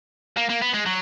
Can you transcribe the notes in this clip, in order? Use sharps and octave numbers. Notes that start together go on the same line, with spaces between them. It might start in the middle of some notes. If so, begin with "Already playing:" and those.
A#3
A#3
B3
G#3
F#3